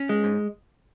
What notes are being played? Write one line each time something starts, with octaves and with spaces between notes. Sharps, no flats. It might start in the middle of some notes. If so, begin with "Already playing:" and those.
Already playing: C#4
G#3
G#2